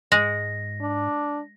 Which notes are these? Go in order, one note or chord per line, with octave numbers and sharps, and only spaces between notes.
G#2 G#3 A#6
D4